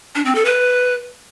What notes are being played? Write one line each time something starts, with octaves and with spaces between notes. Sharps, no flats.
D4
C4
A4
B4